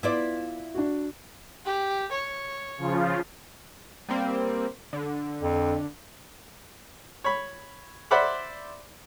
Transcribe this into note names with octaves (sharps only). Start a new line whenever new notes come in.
B3 E4 F4 D5
D4 F#4
G4
C#5
C#3 F3 F4
G3 A#3 C4
D3
F2
C#5 B5
C5 D5 E5 F#5 B5 D6